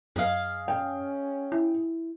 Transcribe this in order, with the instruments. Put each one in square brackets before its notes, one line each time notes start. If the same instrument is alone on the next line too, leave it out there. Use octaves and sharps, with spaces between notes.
[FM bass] F#2 [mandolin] G#4 D#5 F5
[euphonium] C#4 [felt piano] G5
[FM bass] E4